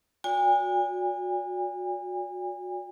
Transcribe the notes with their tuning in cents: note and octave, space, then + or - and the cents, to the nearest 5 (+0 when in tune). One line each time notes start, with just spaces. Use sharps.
F#4 -35 D5 -35 G#5 -40